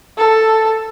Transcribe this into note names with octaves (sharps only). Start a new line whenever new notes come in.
A4